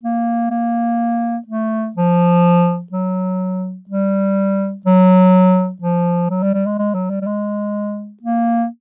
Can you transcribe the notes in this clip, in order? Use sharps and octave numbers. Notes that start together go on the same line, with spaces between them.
A#3
A#3
A3
F3
F#3
G3
F#3
F3
F#3
G3
G3
G#3
G#3
F#3
G3
G3
G#3
A#3